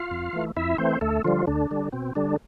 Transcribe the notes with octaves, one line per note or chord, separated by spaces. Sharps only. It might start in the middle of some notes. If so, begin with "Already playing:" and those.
Already playing: F4 F5
F2
E3 A3
F2 E4 E5
E3 A3 C4 C5
D2 A3 A4
D3 F3 G3 F4
D2 D3 D4
D3 G3
B2 C4
D3 G3 D4